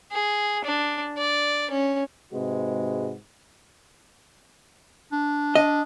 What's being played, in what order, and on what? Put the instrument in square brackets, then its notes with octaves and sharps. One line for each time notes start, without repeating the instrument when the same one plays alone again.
[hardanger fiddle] G#4
D4
D5
C#4
[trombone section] G#2 C3 G#3 F#4 B4
[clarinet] D4
[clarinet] D4 [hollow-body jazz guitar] D#5